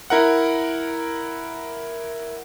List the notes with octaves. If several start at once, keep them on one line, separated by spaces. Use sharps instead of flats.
E4 A#4 F#5